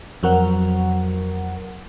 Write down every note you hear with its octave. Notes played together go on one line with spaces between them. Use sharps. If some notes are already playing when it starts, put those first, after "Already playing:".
F2 F#3 A#4 F#5